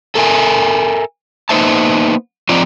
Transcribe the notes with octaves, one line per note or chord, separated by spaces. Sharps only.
A4 A#4 E5 G#5
A#3 B3 D#4 C5 E5 A5
F3 C4 D#4 F4 D5